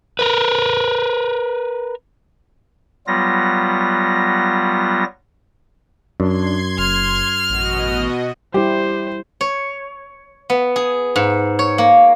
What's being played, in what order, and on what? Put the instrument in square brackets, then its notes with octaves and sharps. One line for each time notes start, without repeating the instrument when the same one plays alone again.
[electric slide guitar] A#4 B4
[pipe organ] F#3 G3 B3 F4 A#6
[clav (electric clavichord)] F#2 [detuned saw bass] D4 [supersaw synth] C6 G#6
[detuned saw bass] F#1 [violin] F6
[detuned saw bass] A1 [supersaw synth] B2 F#4 D#5
[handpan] G3 E4 [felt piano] G4 [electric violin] C5
[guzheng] C#5
B3
G#4
G#2
C#5
A#3